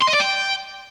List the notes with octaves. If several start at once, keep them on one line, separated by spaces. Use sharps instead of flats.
C6
D#5
D5
G5